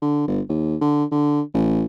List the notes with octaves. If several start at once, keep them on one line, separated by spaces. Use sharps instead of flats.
D3
G1
D#2
D3
D3
A1